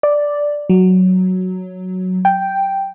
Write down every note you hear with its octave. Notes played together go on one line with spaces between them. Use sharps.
D5
F#3
G5